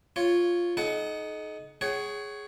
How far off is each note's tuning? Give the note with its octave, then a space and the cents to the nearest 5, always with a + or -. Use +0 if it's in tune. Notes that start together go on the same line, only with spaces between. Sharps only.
F4 +0 C#5 +0
D#4 +0 A4 -45 F#5 +10
G#4 +0 C#5 +0 F#5 +35